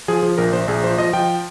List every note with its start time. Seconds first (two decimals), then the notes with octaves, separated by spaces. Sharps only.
0.08 F3 G#4
0.23 F3
0.38 A#1 A#4
0.53 A#1 C5
0.68 A#1 G#4
0.83 F3 C5
0.98 F3 D#5
1.13 F3 G5